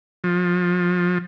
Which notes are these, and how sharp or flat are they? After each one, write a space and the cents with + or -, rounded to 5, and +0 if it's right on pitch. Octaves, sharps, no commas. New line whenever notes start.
F3 +30